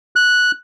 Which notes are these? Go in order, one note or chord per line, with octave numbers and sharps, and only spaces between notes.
F#6